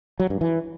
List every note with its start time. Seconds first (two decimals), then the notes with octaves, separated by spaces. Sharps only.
0.20 F#3
0.30 G2
0.41 E3